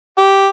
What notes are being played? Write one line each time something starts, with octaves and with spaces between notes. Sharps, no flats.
G4